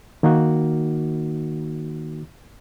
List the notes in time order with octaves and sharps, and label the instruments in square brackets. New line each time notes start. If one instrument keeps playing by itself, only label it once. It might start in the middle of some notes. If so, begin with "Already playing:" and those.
[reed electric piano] D#3 A#3 D#4 F#4